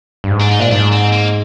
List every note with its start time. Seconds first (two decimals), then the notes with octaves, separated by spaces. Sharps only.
0.24 G2
0.30 G#2
0.41 D4
0.52 D#4
0.59 A#2 D4
0.71 G#2 D4
0.92 C4
1.12 A#3